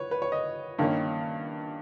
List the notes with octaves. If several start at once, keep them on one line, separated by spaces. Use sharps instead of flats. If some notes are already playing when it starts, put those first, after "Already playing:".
Already playing: B4 C#5
B4
C#5
D#5
G2 D#3 A#3 C#4